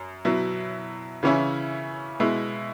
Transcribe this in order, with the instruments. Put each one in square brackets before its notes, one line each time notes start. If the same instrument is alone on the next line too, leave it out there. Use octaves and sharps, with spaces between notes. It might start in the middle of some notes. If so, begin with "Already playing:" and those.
Already playing: [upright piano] F#2
B2 F#3 E4
C#3 E3 C#4 E4
B2 G#3 E4